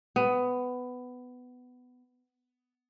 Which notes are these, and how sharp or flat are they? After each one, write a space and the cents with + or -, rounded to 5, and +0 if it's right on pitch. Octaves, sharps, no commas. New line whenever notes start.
B3 +15